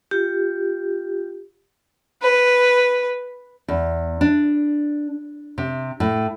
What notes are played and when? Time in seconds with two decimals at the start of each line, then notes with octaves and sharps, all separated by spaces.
0.11 F4 G4
2.22 B4
3.68 E2
4.21 D4
5.58 C3
6.00 A2